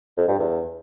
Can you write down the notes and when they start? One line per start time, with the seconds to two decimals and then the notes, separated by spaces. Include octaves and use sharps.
0.17 F2
0.28 G2
0.39 E2